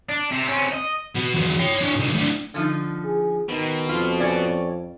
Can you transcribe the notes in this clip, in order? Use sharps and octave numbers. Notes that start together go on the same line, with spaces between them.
D4
C3
C3 C#4
D#5
B2
E2 F#3
C#5 G5
D4 C#5
C2 D#3
A2 D4
D3 F3 D#4
G#4
B2 D#3
F2 F4
C#4 D5